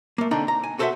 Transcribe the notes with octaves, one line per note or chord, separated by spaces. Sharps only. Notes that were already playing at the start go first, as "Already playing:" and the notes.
A3 A#3
D3 C4 D4 D#4 G5 A#5
A#5
G#5
F#4 A4 C5 C#5 E5 F#5